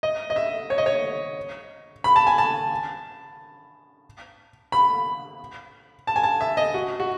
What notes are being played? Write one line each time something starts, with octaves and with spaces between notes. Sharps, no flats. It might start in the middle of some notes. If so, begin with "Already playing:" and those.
D#5
D#5
E5
C#5
D#5
C#5
B5
A5
G#5
A5
B5
A5
G#5
A5
E5
D#5
F#4
F#4